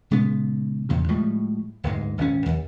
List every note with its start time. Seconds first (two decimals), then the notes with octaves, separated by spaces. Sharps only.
0.11 A#2 C#3 G#3 B3
0.89 E2 A#2 C#3
1.09 A2 F3 G3 G#3
1.84 D1 G1 G#2 G#3
2.17 D#1 G#1 B2 C#4
2.46 D#2